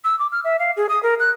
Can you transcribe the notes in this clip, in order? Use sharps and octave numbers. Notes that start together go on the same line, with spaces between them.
E6
D6
F6
E5
F5
G#4
D#6
A#4
F#6